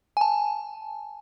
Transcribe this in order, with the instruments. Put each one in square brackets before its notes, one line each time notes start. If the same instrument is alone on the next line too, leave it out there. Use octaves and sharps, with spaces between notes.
[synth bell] G#5
A5